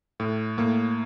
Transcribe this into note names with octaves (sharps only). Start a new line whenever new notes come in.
A2
A2 A#3